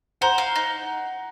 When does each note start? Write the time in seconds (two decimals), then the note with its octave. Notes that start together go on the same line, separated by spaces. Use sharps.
0.21 C5 F#5 A#5
0.38 F5
0.56 D#4